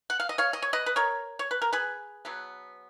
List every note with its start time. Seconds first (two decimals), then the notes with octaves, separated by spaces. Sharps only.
0.10 F#5
0.20 F5
0.29 D#5
0.38 C#5 F5
0.53 D#5
0.62 C#5
0.73 B4 D#5
0.86 B4
0.96 A#4 C#5
1.39 C#5
1.51 B4
1.62 A#4
1.73 G#4 B4
2.25 B2 F#3 B3